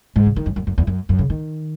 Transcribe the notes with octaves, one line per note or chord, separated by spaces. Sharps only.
G#2
C#3
D#3
F#2
F#2
F#2
E2
F#2
F#2
C#3
D#3